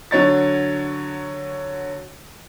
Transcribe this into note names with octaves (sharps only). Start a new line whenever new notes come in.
D3 F#3 C#5 A6